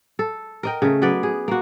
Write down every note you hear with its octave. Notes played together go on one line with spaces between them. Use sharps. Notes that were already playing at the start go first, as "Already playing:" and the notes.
A4
A#4 D#5 G5
C#3 A3
F#3 B3 B4 D5
G#4
A#3 F#4